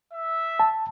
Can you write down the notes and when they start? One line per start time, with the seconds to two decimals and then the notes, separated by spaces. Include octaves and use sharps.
0.13 E5
0.60 A5